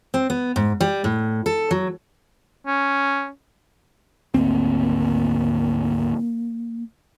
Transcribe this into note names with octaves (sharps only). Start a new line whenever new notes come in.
C4
B3
G#2
G3
A2
A4
F#3
C#4
G#1 D2 A#3 C4